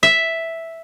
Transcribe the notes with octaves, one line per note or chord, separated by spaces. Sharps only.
E5